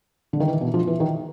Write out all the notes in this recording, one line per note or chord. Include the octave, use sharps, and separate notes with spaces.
D3
D#3
E3
B2
F3
E3
D#3